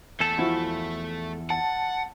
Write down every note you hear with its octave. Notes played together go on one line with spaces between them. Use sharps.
E2 A3 A4
F3 E4 F#4
F#5 A5